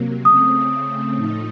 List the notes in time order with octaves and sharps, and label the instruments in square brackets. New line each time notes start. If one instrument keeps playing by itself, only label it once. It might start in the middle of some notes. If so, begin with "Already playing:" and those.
Already playing: [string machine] C3 F#3 A#3
[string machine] C#3 A3 C4 [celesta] D#6
[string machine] A2 F3 A3 D#4